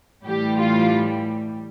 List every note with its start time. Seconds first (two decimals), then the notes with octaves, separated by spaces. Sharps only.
0.25 A2 E3 G3 G4
0.58 F4